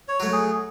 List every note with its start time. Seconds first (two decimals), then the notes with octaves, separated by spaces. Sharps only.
0.08 C#5
0.20 F#3 A3
0.33 G#4